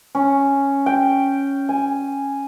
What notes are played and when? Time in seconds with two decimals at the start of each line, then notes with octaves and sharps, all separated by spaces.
0.15 C#4
0.86 G5
1.69 G#5